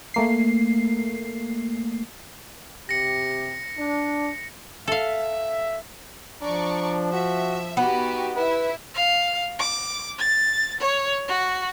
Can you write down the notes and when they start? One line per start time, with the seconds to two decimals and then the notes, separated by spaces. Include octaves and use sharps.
0.14 A3 A#3 C7
2.89 C3 G4 A#6 C#7
3.77 D4
4.88 A4 E5 F5
6.42 F3 D4 D5 A#5 C#6
7.13 F#4 E5
7.77 B3 D#4 F#4 G4
8.35 E4 B4 E5
8.94 F5
9.59 D6
10.19 A6
10.81 C#5
11.28 F#4